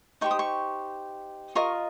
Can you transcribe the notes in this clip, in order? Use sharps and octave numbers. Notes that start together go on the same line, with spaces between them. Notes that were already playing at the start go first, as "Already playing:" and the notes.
D#4 G4 C5 C#6
D#6
C#6
F4 A#4 D#5 C#6